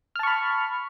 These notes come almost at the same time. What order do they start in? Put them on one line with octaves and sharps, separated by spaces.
F6 A5 C#6 B5